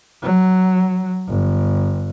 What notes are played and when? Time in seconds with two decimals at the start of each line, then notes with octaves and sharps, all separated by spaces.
0.23 F#3
1.28 G1